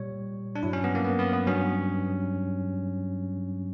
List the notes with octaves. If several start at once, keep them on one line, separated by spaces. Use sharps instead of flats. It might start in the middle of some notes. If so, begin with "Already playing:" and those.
Already playing: A#2 G3 C#5
D4
G2 F#3 E4
C#4
B3
A#3
B3
B3
B3
G2 F#3 C#4